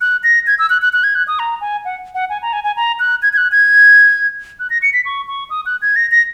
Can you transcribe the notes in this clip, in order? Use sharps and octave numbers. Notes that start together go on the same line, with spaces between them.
F#6
A#6
G#6
E6
F#6
F#6
F#6
G#6
F#6
D#6
A#5
G#5
F#5
F#5
G#5
A#5
G#5
G#5
A#5
F#6
G#6
G#6
F#6
G#6
F#6
A#6
C#7
B6
C#6
C#6
D#6
F#6
G#6
A#6
A#6